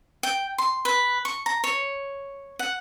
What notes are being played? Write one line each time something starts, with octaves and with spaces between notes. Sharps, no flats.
G5
C6
B4
C#6
A#5
C#5
F#5